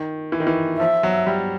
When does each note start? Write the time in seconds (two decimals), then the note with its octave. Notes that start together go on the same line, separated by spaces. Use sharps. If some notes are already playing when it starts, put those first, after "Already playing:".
Already playing: D#3
0.32 E3
0.40 D#3
0.47 E3
0.79 F3 E5
1.03 F#3
1.27 G3